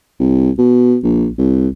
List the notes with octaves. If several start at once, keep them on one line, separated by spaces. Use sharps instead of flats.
C2
B2
A#1
C2